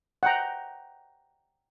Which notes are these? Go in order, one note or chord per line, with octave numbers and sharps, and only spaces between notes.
F#5 G5 A#5